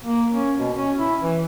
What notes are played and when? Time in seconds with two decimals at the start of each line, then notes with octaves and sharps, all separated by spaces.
0.05 A#3
0.33 C#4
0.59 B2
0.75 C#4
0.98 E4
1.21 E3